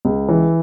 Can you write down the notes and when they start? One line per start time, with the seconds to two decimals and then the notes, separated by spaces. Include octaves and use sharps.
0.05 C#2
0.29 E3